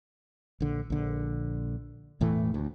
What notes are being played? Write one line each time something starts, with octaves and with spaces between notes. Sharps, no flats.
A#1 D3
A#1 D3
E1 A2 E3 A3
D2